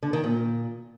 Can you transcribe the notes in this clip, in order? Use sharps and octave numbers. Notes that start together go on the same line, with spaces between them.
D3
D#3
A#2